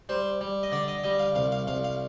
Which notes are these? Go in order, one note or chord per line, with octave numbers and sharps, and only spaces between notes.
G3 C5
G3
D#5
D3 D5
D#5
G3 D#5
F5
C2 F5
F5
C2 F5
F5